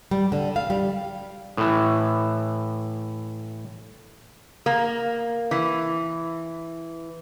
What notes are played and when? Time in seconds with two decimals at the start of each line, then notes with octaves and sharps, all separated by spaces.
0.11 G3
0.32 D3
0.56 F5
0.70 G3
1.57 A2 E3
4.66 A#3
5.51 E3